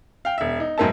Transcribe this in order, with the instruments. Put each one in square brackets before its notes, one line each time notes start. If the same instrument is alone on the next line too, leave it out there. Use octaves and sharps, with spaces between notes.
[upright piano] F5 G5
E1 E5
D#4
B1 G#2 B2 A#3 E5 A5